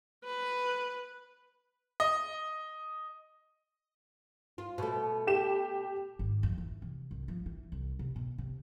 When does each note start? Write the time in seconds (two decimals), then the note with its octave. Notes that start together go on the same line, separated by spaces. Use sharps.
0.24 B4
2.00 D#5
4.58 F4
4.78 B2 A3
5.27 G4 E7
6.19 G#1
6.43 F2
6.58 E3
6.82 C3
7.11 C2
7.28 F3
7.46 E3
7.72 C2
7.99 C3
8.16 B2
8.38 C3